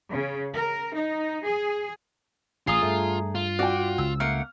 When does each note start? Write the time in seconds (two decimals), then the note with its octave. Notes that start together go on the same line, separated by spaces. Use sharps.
0.11 C#3
0.54 A#4
0.93 D#4
1.46 G#4
2.67 A1 F4 G#4 A#5 D#6
2.82 G2 A3
3.35 F4
3.59 F#4 D5 G5
3.98 C#2 E6
4.20 A3 A#3 F#5 F6